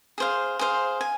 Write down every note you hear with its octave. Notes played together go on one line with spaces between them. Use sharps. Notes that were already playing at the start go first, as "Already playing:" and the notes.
G#4 C5 F5
G#4 C5 F5
G#5